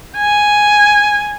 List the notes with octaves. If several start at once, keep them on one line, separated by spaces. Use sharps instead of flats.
G#5